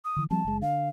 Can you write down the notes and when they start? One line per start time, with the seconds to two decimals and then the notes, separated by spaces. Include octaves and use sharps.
0.05 D#6
0.16 D3 E3
0.31 F3 G3 C4 A5
0.45 F#1 G#3
0.62 D3 F5